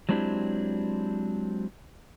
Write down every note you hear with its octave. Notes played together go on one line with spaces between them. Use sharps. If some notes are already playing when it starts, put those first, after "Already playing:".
F#3 G#3 C4 D4 E4 G4